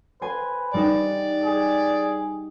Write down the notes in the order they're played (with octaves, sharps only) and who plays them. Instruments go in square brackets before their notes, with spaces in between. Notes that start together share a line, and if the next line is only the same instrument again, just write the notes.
[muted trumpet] B4 [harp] C5 G#5
[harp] G3 D#4 E7 [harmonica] D5
[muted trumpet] G#4